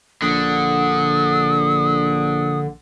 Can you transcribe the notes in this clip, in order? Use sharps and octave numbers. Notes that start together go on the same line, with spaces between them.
A#1 D3 D#6